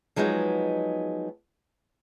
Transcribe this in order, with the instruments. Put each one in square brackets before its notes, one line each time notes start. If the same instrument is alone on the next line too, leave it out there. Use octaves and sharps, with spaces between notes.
[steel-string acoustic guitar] F3 F#3 G#3 B3 D#4